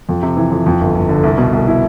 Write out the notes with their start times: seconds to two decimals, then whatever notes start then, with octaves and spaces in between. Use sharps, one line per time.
0.09 F2
0.23 C3
0.37 E3
0.51 F2
0.66 F2
0.81 G1
0.95 G1
1.09 D3
1.23 C2
1.38 B2
1.53 C2
1.68 E4